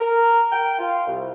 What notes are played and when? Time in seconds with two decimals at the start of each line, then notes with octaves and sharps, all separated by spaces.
0.01 A#4
0.52 G5
0.79 F4
1.07 C2